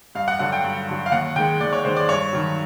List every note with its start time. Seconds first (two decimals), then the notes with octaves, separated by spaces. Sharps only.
0.15 G2 F5
0.28 F#5
0.39 D3 F#3 F#5
0.52 G5
0.64 G2
0.88 D3 F#3
1.06 F5
1.12 D#2 F#5
1.36 D#3 G#3 G5
1.60 D#2 D5
1.73 C#5
1.85 D#3 G#3 C5
1.97 D5
2.09 G2 C#5
2.33 D#3 F#3